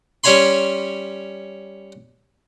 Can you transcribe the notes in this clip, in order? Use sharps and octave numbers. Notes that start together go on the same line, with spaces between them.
G3 C#4 C#5 G#5 B5 C6